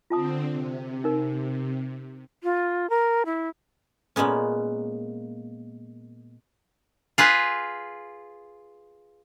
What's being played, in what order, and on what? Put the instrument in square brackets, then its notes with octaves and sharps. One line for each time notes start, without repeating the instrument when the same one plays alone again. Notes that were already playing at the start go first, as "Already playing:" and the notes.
[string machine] D3 C4 [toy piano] F4 A5 D#6
[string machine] C3
[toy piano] D#4 A#4
[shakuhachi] F4
A#4
E4
[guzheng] A#2 G#3 A#3 B3 C#4
[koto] F4 G#4 B4